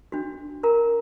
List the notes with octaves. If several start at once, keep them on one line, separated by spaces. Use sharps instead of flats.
D4 F#4
A#4 A#5